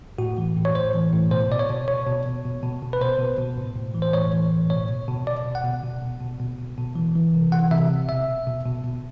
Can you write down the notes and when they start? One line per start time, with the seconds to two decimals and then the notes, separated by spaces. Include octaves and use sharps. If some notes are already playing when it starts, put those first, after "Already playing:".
0.18 A2 F#4
0.38 E3
0.56 A2
0.65 C#5
0.75 A2 C5
0.94 E3
1.12 A2
1.31 B2 C5
1.51 B2 D5
1.59 C#5
1.70 B2
1.88 B2 C#5
2.07 B2
2.26 B2
2.45 B2
2.63 B2
2.82 B2
2.93 B4
3.01 B2 C5
3.19 B2
3.38 B2
3.58 A2
3.76 A2
3.95 E3
4.02 C5
4.14 A2 C#5
4.33 E3
4.52 A2
4.70 B2 C#5
4.89 B2
5.08 B2
5.26 B2 D5
5.45 B2
5.55 F#5
5.64 B2
5.83 B2
6.02 B2
6.20 B2
6.40 B2
6.59 B2
6.78 B2
6.95 E3
7.16 E3
7.34 C3
7.52 E3 F#5
7.71 C3 E5
7.91 C3
8.09 B2 E5
8.28 B2
8.47 B2
8.66 B2
8.84 B2